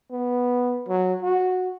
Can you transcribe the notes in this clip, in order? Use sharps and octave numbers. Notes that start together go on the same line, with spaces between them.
B3
F#3
F#4